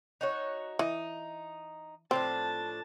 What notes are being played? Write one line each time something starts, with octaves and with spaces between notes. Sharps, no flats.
D#4 F#4 C#5
E3 D#4
A2 F3 C4 D4 A5